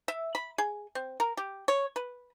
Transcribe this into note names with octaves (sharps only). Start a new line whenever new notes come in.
E5
B5
G#4
C4
A#4
G4
C#5
B4